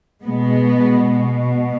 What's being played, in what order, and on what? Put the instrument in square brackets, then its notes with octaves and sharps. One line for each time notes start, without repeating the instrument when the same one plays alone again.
[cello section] B2 G#3 B3